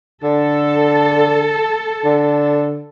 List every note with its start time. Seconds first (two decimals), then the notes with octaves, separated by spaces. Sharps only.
0.24 D3 A4
2.05 D3